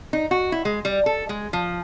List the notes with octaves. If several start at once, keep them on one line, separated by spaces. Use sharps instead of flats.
D#4
F#4
E4
G#3
G3
A4
G#3
F3